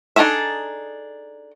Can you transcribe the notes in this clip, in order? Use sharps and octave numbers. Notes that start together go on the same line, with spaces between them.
D4 D#4 G#4 A4 E5